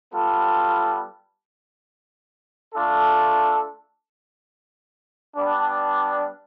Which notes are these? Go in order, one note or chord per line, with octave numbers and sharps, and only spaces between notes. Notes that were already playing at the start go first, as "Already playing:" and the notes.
G3 B3 F4 A4
A3 D4 F4 A4
G3 B3 D4